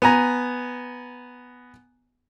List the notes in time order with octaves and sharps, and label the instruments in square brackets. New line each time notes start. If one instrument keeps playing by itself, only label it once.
[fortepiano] B3 G#5 A#5